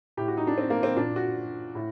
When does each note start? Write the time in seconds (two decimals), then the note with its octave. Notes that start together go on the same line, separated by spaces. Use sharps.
0.17 A2 G4
0.28 F#4
0.37 D#4
0.47 D4
0.58 C4
0.70 A#3
0.83 C4
0.97 A#2 D4
1.16 F#4
1.75 A2